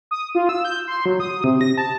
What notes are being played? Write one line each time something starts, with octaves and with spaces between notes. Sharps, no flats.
D#6
F4
E6
G6
C6
F#3
D#6
C3
A#6
A5